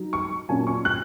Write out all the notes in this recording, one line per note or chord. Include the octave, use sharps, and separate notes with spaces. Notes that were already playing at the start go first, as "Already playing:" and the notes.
Already playing: F#3 D#4
C#6
A#2 F#3 C#4 G#5
C#6
F#6